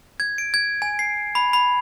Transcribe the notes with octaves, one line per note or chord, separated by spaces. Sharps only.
G#6
D7
G#6
G#5
C7
B5
B5